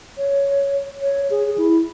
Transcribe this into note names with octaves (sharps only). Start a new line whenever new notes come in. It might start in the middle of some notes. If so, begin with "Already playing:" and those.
C#5
C#5
G#4
E4